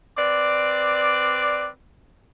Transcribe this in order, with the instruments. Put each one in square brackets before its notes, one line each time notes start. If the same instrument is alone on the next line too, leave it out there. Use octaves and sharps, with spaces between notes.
[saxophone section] C4 B4 D5